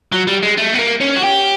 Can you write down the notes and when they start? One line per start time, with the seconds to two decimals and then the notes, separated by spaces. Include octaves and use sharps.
0.12 F#3
0.27 G3
0.43 G#3
0.57 A3
0.74 B3
0.79 A#3
1.01 C#4
1.16 F#4
1.23 G4